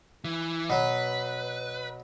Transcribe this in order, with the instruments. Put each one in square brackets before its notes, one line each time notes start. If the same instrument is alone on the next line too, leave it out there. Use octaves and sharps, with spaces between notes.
[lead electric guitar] E3
[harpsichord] B2 F#3 [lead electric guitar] B4